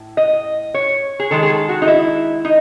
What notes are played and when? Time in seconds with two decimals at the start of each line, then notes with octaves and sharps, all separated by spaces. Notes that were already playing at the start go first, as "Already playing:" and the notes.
Already playing: A2
0.17 D#5
0.74 C#5
1.20 G#4
1.31 D#3 G#3 A4
1.42 G#4
1.50 A4
1.69 F#4
1.82 D#4
1.87 E4
2.45 D#4